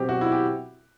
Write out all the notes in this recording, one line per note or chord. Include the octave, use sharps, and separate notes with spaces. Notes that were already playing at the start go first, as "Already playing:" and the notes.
Already playing: B2 F#3 C4 G4
F#4
E4
G4